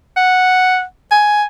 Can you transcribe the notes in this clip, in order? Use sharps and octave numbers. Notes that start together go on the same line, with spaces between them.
F#5
G#5